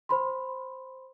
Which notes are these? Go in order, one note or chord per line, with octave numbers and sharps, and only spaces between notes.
C5 B5 C6